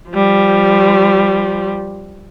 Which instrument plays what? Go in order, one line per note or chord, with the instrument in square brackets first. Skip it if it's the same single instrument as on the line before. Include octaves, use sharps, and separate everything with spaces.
[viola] F3 G3